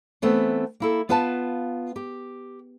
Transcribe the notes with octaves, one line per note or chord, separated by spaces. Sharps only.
E3 A3 B3 C4
A#3 E4 A4
B3 F4 B4 F5 A5
G4